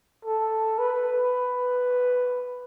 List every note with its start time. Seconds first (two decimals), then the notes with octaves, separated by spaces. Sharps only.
0.25 A4
0.79 B4